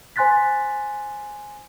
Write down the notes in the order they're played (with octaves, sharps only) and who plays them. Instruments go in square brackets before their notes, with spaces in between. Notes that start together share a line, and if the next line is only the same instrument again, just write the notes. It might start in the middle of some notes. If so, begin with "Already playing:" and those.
[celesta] C5 G#5 C6 F#6 A6 B6